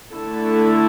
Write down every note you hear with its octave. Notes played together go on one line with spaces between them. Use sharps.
D3 A3 E4 A4